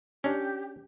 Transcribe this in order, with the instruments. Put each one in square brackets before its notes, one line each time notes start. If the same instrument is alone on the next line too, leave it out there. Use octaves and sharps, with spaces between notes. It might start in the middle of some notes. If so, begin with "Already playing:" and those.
[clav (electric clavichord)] C#4 D4 [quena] G4